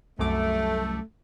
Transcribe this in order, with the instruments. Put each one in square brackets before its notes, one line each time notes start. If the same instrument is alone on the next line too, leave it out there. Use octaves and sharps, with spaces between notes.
[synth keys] C2 F#2 D6 [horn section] A3